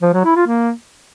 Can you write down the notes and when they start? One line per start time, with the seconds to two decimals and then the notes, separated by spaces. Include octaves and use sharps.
0.02 F3
0.13 F#3
0.24 E4
0.36 F4
0.47 A#3